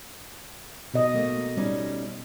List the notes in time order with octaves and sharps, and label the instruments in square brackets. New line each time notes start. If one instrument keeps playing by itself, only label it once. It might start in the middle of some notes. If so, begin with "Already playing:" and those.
[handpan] B2 D#5
[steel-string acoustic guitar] A3 A#3
G3 C#4 D#4